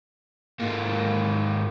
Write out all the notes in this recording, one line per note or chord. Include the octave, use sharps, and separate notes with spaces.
G#2 A#3